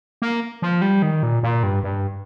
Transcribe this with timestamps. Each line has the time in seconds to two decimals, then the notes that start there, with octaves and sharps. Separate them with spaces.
0.22 A#3
0.62 F3
0.82 G3
1.02 D#3
1.23 A#2
1.43 A#2
1.63 G2
1.83 G2